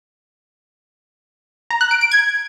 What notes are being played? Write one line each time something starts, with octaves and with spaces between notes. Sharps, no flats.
A#5
F#6
D7
D7
G#6